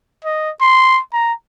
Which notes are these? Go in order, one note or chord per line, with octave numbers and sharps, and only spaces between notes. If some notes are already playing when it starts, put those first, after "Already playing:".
D#5
C6
A#5